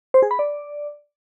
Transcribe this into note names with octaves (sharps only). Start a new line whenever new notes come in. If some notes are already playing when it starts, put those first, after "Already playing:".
C5
G#4
B5
D5